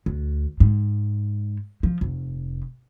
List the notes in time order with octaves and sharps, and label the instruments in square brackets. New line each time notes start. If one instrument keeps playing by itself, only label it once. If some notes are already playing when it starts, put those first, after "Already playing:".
[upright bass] D2
G#2
F3
F1